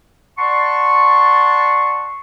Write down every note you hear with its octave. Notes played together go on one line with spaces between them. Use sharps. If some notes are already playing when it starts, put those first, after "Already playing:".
D5 F#5 A5 C6 C#6